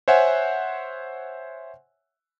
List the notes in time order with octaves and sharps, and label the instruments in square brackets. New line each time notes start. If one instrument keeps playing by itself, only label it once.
[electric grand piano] C5 C#5 E5 F#5 G#5